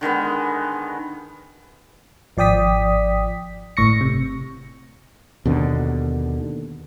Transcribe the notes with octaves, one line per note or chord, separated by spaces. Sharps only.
D3 D#3 G#3 B3
G#1 F3 D5 G5 D#6 B6
G1 A2 C#6 A#6 C#7
C3
D#2 B2 D3